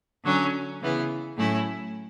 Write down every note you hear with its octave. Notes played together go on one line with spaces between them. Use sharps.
D3 F#3 C#4
C#3 E3 B3
A2 F#3 A3 C#4 E4